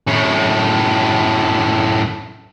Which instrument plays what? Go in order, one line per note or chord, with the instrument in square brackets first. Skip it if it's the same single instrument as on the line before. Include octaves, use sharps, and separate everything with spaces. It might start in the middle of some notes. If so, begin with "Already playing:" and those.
[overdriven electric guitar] F#2 A2